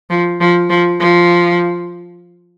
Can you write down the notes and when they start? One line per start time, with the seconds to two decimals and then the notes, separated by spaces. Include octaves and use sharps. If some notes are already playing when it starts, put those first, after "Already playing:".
0.10 F3
0.40 F3
0.70 F3
1.00 F3